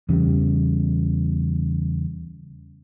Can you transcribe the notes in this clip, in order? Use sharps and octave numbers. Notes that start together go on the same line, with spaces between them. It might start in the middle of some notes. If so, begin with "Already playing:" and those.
E2 C#3 G3